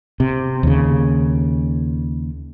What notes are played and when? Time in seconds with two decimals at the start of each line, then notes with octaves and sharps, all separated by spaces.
0.20 C3
0.63 D#2 C#3